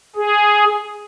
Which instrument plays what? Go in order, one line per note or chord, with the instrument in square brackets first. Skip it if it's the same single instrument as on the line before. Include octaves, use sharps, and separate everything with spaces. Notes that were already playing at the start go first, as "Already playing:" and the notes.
[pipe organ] G#4